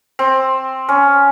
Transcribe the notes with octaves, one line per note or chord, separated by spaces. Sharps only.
C4
C#4